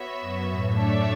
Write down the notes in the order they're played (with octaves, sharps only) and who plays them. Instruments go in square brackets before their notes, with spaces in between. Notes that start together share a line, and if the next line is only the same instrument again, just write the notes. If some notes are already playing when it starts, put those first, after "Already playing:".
Already playing: [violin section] B3 F#4 C#5 E5
[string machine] F#2
A2
[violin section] A3 D4 A4 C#5 E5